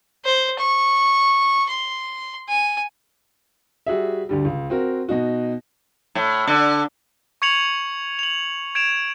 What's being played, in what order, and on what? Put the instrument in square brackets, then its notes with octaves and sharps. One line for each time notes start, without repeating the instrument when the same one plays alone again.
[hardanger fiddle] C5
C#6
C6
G#5
[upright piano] G3 F#4 G#4 E5
D2 D3 G3
C#2
C4 F#4 A#4
B2 D#4 F#4
[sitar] A2
D3
[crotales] C#6 G#6 C#7 F7 F#7
F7 F#7
G#6 D7 E7 F7